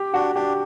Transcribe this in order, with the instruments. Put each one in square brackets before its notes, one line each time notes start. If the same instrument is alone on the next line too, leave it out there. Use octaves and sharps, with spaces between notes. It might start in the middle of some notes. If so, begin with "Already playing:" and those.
Already playing: [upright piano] G4
[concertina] D4 [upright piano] F#4
[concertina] D4 [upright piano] G4